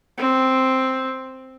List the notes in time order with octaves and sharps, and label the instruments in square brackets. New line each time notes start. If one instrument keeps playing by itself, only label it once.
[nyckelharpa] C4